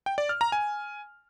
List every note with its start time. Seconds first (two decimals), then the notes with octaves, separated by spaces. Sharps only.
0.06 G5
0.18 D5
0.29 F6
0.41 A#5
0.52 G#5